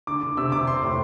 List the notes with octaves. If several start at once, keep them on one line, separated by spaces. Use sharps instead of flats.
D3 D6
D3
C3 E6
C3 D6
C4 C6
A2